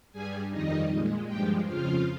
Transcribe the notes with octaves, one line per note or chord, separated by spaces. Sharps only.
G2 G3 G#4 G#5
F2 D#3 G3 D#4 D#5
A#2 G#3
G2 F3 G#3 G4 G5
F2 C#3 F3 F4 F5